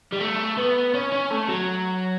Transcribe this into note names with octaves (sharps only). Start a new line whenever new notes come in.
G3
A3
B3
C#4
C#4
A3
F#3